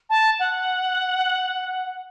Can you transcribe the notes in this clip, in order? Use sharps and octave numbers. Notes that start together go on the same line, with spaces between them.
A5
F#5